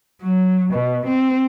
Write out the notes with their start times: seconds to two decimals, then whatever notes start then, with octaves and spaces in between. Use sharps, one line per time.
0.23 F#3
0.74 B2
1.07 C4